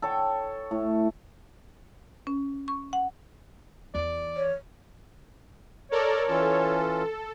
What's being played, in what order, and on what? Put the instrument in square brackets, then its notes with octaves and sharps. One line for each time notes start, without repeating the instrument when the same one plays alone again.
[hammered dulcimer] A4 C#5 G5
A2
[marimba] C#4
C#6
F#5
[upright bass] E2 [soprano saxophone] D5
[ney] C#5
[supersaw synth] A4 A#4 D5 [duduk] C#5
[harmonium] E3 C#4 F4 [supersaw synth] A4